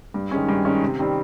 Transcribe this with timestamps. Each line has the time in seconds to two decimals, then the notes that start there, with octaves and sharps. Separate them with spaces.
0.14 G2
0.31 D#3 G#3 C#4
0.49 G2
0.65 D#3 G#3 C#4
0.82 C3
0.99 D#3 G3 C4